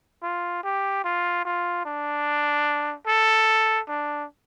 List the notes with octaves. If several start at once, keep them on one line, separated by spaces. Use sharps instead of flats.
F4
G4
F4
F4
D4
A4
D4